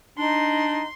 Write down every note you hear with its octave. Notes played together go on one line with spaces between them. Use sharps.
D4 D#4 C6